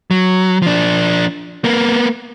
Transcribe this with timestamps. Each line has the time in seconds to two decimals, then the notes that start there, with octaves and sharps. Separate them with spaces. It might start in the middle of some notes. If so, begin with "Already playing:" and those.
0.11 F#3
0.62 F3 D4
1.64 A#3 B3